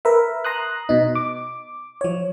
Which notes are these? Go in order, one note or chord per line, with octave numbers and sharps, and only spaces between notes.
A#4 B4 E5
A#5 C6 D#6 F#6
B2 D#4
D6
F3 C#5